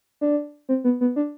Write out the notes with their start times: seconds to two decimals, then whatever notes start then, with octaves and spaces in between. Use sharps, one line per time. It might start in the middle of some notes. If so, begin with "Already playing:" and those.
0.21 D4
0.69 C4
0.84 B3
1.01 B3
1.16 D4